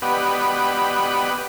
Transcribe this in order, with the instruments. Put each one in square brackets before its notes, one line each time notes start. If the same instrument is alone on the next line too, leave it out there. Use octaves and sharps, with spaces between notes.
[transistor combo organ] B3 G4 B4 D5 D#5 F#5